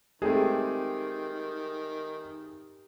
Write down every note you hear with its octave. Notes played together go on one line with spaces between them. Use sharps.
D#3 G#3 A3 C4 G4 G#4